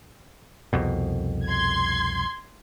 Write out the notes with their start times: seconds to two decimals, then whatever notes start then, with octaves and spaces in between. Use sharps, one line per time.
0.73 C2 F2 B2
1.44 C6 G#6